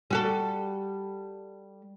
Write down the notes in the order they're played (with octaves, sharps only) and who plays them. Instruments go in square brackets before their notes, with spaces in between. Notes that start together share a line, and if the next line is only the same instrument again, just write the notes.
[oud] G3 F#4 A4